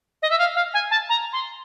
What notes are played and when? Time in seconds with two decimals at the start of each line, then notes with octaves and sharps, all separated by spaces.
0.22 D#5
0.30 E5
0.38 F5
0.55 F5
0.73 G#5
0.90 A5
1.09 A#5
1.32 C6